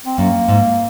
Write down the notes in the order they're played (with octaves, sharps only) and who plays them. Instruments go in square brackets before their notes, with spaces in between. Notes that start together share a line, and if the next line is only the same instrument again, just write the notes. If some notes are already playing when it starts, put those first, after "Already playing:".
[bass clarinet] C4
[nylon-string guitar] F#2 [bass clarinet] A#3
[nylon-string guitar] G#2